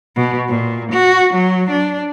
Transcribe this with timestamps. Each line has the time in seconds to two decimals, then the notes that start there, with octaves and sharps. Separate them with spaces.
0.16 B2
0.48 A#2
0.93 F#4
1.34 F#3
1.71 D4